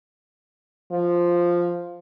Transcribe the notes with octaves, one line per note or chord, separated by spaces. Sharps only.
F3